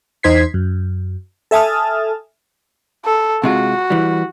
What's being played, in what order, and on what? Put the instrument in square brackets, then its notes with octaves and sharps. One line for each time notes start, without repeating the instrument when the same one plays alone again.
[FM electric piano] E2 D#4 C5 G#6 B6 C7
F#2
A4 E5 G#5 A5 D#6 F6
[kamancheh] A4
[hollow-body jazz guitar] C3 G#3 F4 [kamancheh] F#4
[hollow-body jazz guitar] E3 G3